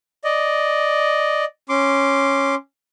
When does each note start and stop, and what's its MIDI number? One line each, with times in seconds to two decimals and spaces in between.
0.24 1.45 74
0.24 1.45 75
1.69 2.55 61
1.69 2.55 84
1.69 2.55 86